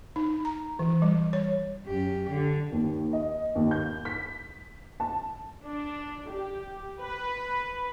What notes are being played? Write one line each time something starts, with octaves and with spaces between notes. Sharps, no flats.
D#4
A#5
E3
G3
C#5
F#2 G4
D3
D#2
D#5
D#2
G6
B6
A5
D4
G4
B4